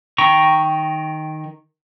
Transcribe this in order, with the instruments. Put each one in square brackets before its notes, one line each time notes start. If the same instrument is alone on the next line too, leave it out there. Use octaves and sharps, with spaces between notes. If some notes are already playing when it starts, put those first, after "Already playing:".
[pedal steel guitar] D#3 G5 A#5 C#6